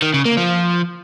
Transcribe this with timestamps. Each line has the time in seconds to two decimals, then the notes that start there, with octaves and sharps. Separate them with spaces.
0.02 D#3
0.14 C#3
0.25 A#3
0.37 F3